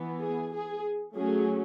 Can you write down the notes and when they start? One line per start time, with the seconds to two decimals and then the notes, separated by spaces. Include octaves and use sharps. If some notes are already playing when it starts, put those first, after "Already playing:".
Already playing: E3 B3
0.21 G#4
0.53 G#4
1.16 F#3 A3 C#4 G#4